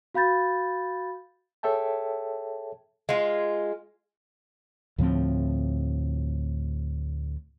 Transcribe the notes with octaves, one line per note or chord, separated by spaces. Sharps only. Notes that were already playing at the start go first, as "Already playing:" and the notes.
F#4 F5 B5 G6 A6
G#4 A4 C#5 E5 G5 A5
G#3 F4
D2 A2 F3 C4